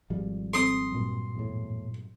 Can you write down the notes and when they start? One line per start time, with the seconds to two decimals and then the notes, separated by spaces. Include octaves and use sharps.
0.10 G#1 F3 G3
0.54 C4 A4 C6 D#6
0.92 G2 A#2 F#3
1.35 E2 A2